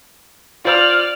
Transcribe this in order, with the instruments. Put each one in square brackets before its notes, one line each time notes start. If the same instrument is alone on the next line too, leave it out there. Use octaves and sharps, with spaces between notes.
[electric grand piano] F4 C5 [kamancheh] D5 F6